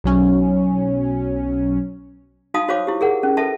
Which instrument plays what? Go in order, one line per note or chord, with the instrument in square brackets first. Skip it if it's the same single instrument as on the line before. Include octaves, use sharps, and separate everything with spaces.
[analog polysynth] B1 F#3 C#4
[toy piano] D#4 F#4 F5 A5 D#6
F#4 C5 C#5 F5 D6
E4 G4
G#4 A#4 F#5
C#4
A4 B4 E5 A5